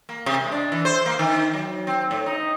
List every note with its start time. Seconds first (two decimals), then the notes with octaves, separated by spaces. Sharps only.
0.09 A#3
0.26 C3
0.40 G#3
0.52 D4
0.72 E3
0.85 C5
1.06 A#3
1.19 D#3
1.54 F#3
1.87 C4
2.11 A2
2.26 D#4